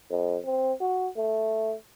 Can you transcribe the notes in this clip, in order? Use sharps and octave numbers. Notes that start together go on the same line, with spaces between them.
F2
C4
F#4
A3